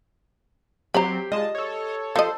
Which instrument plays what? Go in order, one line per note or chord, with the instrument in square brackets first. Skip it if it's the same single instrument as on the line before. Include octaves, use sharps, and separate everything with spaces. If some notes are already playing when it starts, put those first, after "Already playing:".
[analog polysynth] F#3 C4 [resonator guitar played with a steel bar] G4 C5 [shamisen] A#5 B5
[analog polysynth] G#3 F4 A5 [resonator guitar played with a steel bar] D#5
[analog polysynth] A4 C#5
[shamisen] F3 D#5 [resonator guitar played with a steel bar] A4 [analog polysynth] C5